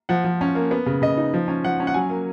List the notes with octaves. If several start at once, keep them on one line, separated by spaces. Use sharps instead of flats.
F3 F#5
F3
C#4
A#3
B3
C#3
C#3 D#5
D#4
F3
C#4
F3 F#5
C#4
F#5
F#3 G#5
A#3